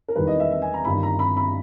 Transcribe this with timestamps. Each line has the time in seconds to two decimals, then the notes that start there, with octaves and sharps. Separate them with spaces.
0.08 A#4
0.16 E1 E2 D#3 G3 B4
0.27 D#5
0.40 E5
0.51 E5
0.62 G#5
0.74 A#5
0.85 G1 G2 D#3 B5
1.03 A#5
1.19 B5
1.37 B5